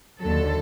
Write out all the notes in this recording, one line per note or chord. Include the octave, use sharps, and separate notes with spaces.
D#2 D3 F#3 A4